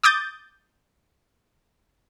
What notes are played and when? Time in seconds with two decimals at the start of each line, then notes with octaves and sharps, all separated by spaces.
0.04 D6 D#6 G6 A6